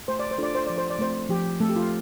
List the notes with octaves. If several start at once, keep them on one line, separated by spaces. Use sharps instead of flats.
A3 C5
D5
C5
D4 F4 A4 D5
C5
F3 D5
C5
D5
A3 C4 C5
F3 G4
A3 C4 A4
G4
F4